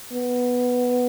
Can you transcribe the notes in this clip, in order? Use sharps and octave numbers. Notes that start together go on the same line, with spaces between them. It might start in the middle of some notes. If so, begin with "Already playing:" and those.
B3